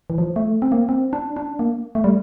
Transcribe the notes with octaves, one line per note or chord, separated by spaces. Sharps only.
E3
F3
A3
C4
A#3
C4
D4
D4
A#3
A3
G3